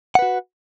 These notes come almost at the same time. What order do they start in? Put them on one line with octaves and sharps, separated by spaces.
F#5 B4 F#4